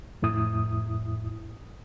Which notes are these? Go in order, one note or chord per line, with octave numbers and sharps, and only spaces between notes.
F2 A2 E4 D#6